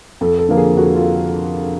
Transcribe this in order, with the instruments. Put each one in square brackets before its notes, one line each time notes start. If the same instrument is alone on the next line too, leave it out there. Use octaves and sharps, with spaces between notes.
[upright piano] F2 A4
A4
D3 F3 A#3
G#4
F2 F#4
F4